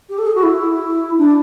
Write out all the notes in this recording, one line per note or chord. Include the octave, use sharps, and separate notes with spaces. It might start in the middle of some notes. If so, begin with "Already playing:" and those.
G4
A4
G#4
F#4
E4
D4